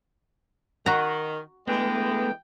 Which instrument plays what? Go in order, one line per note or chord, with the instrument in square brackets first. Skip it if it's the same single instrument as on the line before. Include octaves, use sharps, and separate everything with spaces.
[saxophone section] D#3 [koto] F#4 A#5
[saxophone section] D3 E3 G#3 [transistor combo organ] A3 B3 [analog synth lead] G5